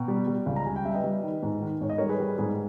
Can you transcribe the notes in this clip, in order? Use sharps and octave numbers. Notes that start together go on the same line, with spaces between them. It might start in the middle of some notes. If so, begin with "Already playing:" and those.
Already playing: B2 G5 A#5
G3
G3
C#2
A#5
G3 G#5
G5
G3 E5
B4 D#5
G3
D#3
G#2
D#3
G#2 C#5
D#5
G3 A#4 C#5
G#4 B4
G3
G#2 G#4